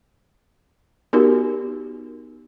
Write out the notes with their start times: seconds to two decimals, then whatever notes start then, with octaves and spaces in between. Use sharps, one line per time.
1.13 B3 D#4 F#4 G4 A#4